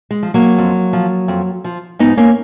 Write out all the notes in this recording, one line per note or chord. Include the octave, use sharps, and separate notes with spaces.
G#3
F3
F#3 A#3
F2
F3
F2
F3
G#2 B3 D#4
A#3 C#4